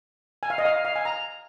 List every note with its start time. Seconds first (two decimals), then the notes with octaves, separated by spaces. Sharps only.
0.43 G#5
0.50 F5
0.58 D#5
0.65 F5
0.85 F5
0.96 G#5
1.05 A#5